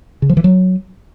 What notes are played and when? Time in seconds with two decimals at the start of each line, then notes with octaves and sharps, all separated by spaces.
0.22 C#3
0.30 F3
0.37 E3
0.44 F#3